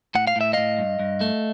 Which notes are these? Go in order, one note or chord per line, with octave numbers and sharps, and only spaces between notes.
A2 F#5
F5
A2 E5
A2 D#5 F5
G2
G2
A3